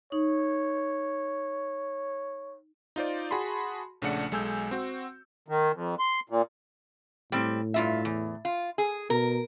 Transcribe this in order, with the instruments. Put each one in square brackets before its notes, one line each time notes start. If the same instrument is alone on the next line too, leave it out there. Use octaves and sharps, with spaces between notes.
[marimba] D#4 [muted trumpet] C#5
[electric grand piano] D#4 F4 C5 D5
F#4 G#4 A5 B5 C6
A#1 C#3 A3 D4 F#5 C#7
B1 G#3 A4 G#5 E6 G6
C4 F#4
[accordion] D#3
F2
C6
A#2
[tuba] A2 [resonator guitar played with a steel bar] G3 C4
[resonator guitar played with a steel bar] G2 F4 E5
E2
F4
G#4
[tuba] B2 [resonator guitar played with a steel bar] A#4